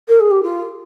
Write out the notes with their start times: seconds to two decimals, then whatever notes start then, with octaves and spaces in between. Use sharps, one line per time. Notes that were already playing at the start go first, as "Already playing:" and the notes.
0.08 A#4
0.20 G#4
0.31 G4
0.43 F4